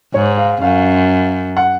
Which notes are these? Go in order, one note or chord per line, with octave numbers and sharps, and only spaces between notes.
G#2 C#5
F5
F#2 F5
F#5